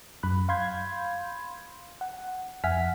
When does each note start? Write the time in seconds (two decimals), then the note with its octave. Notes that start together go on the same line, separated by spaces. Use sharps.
0.23 F#2 B5 F#6
0.49 F5 B5 C6 G6 G#6
2.01 F#5
2.64 F2 E5 F#5 G#5 F6 B6